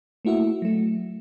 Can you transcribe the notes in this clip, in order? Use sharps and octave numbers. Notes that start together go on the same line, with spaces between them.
A3 A#3 E4 F#4 E5
F#3 A3